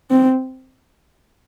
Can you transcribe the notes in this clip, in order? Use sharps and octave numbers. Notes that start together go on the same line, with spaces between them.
C4